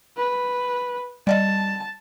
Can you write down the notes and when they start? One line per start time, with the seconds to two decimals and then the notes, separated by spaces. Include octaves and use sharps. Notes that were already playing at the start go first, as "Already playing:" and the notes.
0.17 B4
1.27 G3 D5 D#5 A5